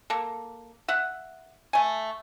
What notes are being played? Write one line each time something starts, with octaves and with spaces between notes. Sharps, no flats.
A#3 A4
E5 F#5
A3 G#5